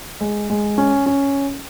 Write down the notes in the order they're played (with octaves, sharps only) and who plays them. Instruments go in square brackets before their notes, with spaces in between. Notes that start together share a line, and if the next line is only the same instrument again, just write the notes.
[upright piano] G#3
G#3
C#4
C#4